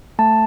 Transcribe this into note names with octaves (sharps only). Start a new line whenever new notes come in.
A3 A5